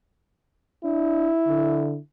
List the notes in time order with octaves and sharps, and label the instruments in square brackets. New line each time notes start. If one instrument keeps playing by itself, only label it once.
[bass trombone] D4 [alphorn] E4
[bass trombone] D3